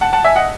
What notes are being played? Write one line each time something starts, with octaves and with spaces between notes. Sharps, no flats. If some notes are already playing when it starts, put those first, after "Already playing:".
F#5 A5
F#5 A5
E5 G#5
D#5 F#5